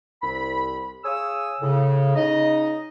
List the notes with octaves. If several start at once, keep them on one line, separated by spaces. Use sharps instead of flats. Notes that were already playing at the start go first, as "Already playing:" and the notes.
C2 B5
G#4 C#5 F5 D#6 E6
A2 C#3
C#3 D#4 D#5